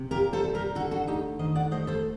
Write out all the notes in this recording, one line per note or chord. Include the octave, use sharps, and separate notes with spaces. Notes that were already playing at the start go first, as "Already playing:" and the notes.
Already playing: C3
A#2 G4 A#4
A4 C5
G3
G4 A#4
D3 F#4 A4
F#4 A4
A3 D#4 G4
D#3 C5 D#5
D5 F#5
A3 C5 D#5
A4 C5